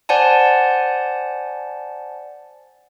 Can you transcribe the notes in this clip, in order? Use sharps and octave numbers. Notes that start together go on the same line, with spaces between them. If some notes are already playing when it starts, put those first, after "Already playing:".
C5 D5 F#5 G#5 A5